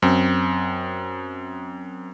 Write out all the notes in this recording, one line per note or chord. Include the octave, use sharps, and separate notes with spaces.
F#2 C4